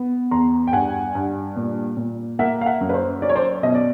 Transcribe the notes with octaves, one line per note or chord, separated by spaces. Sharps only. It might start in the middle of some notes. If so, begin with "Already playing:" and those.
Already playing: B3
E2 A#5 C6
G5
G2 F#5 G#5
G2
A#2
A#2
A#3 E5 F#5
F5
E5 F#5
F#2
B4
C5
C#4 D5
C#5
C5 D5
B2 D#5
D5